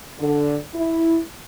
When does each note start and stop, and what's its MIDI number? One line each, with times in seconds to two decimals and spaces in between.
0.19 0.55 50
0.74 1.18 64